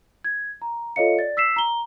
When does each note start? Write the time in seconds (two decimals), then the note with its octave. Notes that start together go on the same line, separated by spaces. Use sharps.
0.24 G#6
0.62 A#5
0.96 F4 A4 C#5 D#5 F5 C#7
1.19 D5 A6
1.37 E6 B6 C7 E7
1.56 A#5 G7